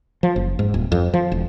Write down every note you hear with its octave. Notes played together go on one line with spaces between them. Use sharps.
F3
F#1
G#2
D#1
F2
F3
E1